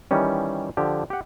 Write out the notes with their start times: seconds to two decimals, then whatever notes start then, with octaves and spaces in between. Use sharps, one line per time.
0.11 D#3 E3 G3 C#4
0.77 D3 F3 G4
1.10 G4 F#5